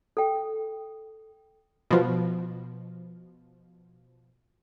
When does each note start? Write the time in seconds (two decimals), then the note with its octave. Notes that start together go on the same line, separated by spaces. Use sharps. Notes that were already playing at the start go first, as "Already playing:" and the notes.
0.17 A4 G5
1.91 B2 F3